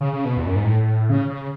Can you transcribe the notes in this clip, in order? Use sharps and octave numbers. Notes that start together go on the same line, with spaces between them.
C#3
C#3
B2
E2
F#2
G#2
A2
C#3
C#3